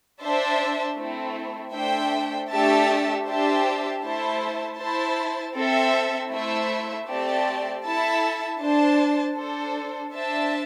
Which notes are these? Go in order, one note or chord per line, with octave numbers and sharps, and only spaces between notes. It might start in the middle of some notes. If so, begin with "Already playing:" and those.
D4 C5 E5 A5
A3 C4 E4
A3 D4 C5 E5 G5
A3 D4 G4 E5 A5
D4 G4 C5 E5 A5
A3 E4 C5 E5 A5
E4 C5 A5
C4 A4 E5
A3 E4 C5 E5
A3 C4 G4 D5 A5
E4 A4 E5 A5
D4 C5 A5
D4 A4 C5
D4 C5 E5 A5